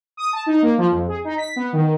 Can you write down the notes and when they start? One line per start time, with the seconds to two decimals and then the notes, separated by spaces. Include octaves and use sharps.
0.17 D#6
0.33 A5
0.46 D#4
0.62 A#3
0.78 F3
0.91 F2
1.08 G#4
1.24 D#4
1.38 B6
1.56 B3
1.73 D#3